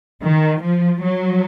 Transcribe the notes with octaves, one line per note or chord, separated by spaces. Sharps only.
D#3
F3
F#3